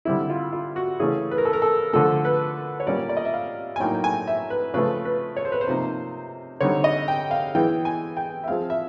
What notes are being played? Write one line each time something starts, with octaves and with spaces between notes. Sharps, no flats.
D3 G3 C4 E4
F4
F4
F#4
C#3 E3 A3 C#4 G#4
B4
A#4
A4
A#4
A4
D3 F3 A3 A4
B4
C#5
A#2 G3 A#3 C#4 D5
D5
D#5
E5
F5
G#5
A2 F#3 A#3 D#4 G5
G#5
E5
B4
C#3 F3 A3 B4
B4
C#5
C5
B4
C5
C3 F3 A#3 D#4
D3 G3 C4 D#4 C#5
D#5
G5
F5
E3 G#3 B3 G5
G#5
G5
E5
F3 G#3 C4 F5
E5